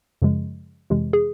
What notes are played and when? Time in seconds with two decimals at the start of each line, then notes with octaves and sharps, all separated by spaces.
0.22 F#2 C#3 F3 G#3
0.90 F2 C3 E3 G#3
1.13 G#4